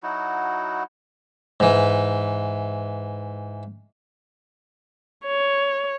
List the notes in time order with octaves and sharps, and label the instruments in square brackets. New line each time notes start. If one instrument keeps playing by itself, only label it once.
[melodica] F#3 D#4 E4 F#4
[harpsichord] G#2 E3
[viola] C#5